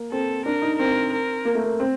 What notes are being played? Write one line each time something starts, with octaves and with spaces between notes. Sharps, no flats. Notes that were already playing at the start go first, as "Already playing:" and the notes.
Already playing: A#3
C4 A4
D4 A#4
D#4
C4 A#4
A#4
A#3
A3
A#3
C4